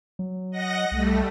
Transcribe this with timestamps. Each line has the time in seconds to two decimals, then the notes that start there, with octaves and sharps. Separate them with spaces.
0.19 F#3
0.50 D#5 F#5 A#6
0.92 C2 G3 A3